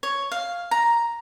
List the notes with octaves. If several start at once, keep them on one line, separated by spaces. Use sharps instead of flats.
C#5
F5
A#5